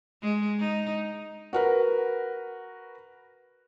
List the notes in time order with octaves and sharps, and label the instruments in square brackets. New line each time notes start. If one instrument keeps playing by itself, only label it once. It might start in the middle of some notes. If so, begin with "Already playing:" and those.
[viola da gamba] G#3
D#4
[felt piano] F#4 A#4 B4